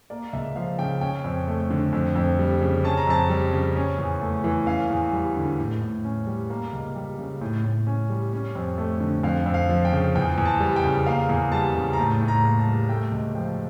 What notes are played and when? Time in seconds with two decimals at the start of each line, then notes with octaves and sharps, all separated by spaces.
0.10 A#3 D5
0.33 C#2 E5
0.56 F3 F5
0.79 C#3 G5
1.01 C#4 G5
1.24 F2
1.48 A3
1.70 D3
1.93 F2
2.16 F2
2.39 G3
2.61 C#3
2.84 C#4 A5
2.97 A#5
3.07 F2 A5
3.30 G3
3.53 C#3
3.76 C#4
3.98 E2
4.21 A3
4.44 E3
4.67 C#4 F5
4.90 E2
5.13 G3
5.36 D3
5.58 A2
5.81 A2
6.04 C#4
6.27 G3
6.50 A#3
6.73 C#2
6.96 G3
7.19 C#3
7.41 A2
7.64 A2
7.87 C#4
8.10 G3
8.33 C#4
8.55 F2
8.78 A3
9.00 D3
9.23 F2 F5
9.46 F2
9.54 F5
9.69 F3
9.85 G5
9.93 C#3
10.15 E2 G5
10.38 E2
10.45 A5
10.60 G3
10.76 G5
10.84 C#3
11.06 A#3 F5
11.29 E2
11.52 G3 A5
11.75 C#3
11.93 A#5
11.98 A2 A5
12.21 A2
12.28 A#5
12.44 A#3
12.59 A5
12.67 G3
12.89 A3 G5
13.12 C#2
13.35 F3 G5